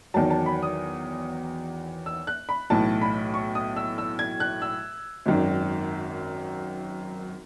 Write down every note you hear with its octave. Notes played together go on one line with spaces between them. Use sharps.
E2 D#3 F#3 A5
A5
B5
D#6
E6
F#6
B5
B1 A2 E3 A5
B5
C#6
D#6
E6
E6
G#6
F#6
E6
G#1 F#2 D#3